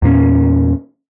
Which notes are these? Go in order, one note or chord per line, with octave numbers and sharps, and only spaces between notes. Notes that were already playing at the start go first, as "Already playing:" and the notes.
E2 A#2 A#3 C#4